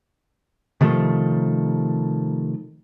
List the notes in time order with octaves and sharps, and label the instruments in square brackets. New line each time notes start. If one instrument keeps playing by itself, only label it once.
[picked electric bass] C3 D#3 F3 A3